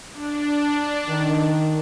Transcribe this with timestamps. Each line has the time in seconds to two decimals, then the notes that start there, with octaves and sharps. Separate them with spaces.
0.12 D4
1.08 D#3